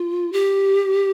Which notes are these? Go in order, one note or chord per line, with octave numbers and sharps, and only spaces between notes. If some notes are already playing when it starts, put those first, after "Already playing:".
Already playing: F4
G4